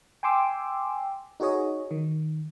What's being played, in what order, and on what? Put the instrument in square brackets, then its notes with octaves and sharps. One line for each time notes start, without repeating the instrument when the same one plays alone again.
[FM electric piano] G5 G#5 C6 D6 E6
D#4 F#4 G#4 C#5 D#5
D#3